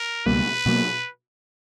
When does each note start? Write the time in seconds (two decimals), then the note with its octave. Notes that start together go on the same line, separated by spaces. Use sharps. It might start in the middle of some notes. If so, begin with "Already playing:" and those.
Already playing: A#4
0.26 C#2 B2 G3 A#3 B4
0.66 B2 F#3 A#3